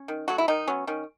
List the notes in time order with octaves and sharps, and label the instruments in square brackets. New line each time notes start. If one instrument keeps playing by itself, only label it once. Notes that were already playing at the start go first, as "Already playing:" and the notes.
Already playing: [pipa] C#4
D#3
F#3 A3 F#4
E4
D#3 D#4
F#3 B3 C#4
D#3 C#4